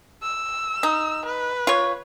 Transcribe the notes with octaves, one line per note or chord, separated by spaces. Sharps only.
E6
D#4
B4
F4 C#5